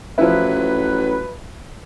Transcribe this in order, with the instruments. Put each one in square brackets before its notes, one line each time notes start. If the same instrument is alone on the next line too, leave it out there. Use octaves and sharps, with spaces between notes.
[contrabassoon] A1 [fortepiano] F3 E4 [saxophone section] F#3 B4